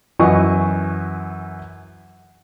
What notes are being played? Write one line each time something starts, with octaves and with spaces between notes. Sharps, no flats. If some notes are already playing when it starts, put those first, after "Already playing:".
F#2 E3 D#5 G#5 C#6